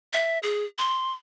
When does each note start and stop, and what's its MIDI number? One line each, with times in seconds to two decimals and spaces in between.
0.13 0.39 76
0.43 0.64 68
0.78 1.12 84